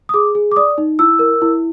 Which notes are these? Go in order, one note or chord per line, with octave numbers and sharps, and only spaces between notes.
D#6
G#4 D6
G#4
D6
D5 D#6
D#4
E4 E6
A#4
E4